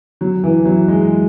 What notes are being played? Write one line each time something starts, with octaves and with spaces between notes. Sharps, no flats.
F#3
E3
F#3
G#3